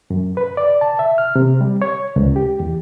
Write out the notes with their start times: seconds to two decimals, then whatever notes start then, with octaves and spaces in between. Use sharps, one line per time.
0.10 F#2
0.37 B4
0.57 D5
0.81 A5
0.99 E5
1.18 F6
1.36 C3
1.61 G3
1.82 C#5
2.16 C#2
2.36 G4
2.60 E2